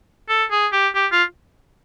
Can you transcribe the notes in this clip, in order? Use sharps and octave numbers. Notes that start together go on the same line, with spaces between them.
A4
G#4
G4
G4
F4